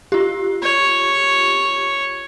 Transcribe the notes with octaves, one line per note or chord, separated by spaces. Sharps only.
F4 G4
C#5